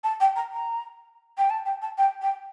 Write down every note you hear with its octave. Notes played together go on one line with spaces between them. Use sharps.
A5
G5
A#5
A#5
G5
A5
G5
A5
G5
G5